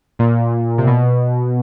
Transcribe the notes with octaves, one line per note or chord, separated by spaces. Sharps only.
A#2
C3
B2